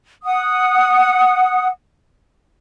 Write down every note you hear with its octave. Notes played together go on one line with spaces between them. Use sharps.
F#5 D#6